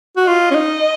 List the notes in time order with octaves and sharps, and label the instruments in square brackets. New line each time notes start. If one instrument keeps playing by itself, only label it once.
[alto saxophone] F#4
[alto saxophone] F4 [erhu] D#5
[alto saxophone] C#4
D#4